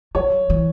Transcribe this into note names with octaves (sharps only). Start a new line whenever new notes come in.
F#3 C#5
E3